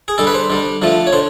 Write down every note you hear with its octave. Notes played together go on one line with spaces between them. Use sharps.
G#4
D3 G3 A4
B4
C5
D3 G3
D3 F3 A3
C#5
D3 C5